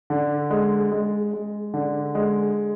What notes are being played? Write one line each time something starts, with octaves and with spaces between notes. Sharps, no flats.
D3
G#3
G#3
G#3
D3
G#3